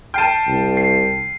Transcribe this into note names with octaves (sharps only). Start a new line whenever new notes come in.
G5 A5 F6 C7 D#7
C2
C7